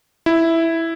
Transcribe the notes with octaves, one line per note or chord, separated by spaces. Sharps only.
E4